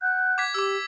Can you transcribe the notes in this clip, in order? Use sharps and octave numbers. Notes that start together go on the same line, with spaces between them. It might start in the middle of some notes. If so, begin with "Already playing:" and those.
F#5 F#6 G6
D6 G#6 B6
G4 D6 E6